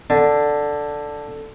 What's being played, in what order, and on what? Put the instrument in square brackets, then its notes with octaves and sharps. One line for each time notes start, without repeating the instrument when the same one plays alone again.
[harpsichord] D3